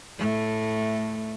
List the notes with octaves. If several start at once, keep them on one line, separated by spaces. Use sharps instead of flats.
A2 A3